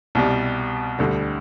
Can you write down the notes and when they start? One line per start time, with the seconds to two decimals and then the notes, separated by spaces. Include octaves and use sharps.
0.15 C2 B2 G3
0.99 D2 D3 G3